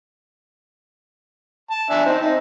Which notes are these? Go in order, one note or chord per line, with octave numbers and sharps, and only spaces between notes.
A5
D4 E5 G#5
C4 D#4
D#4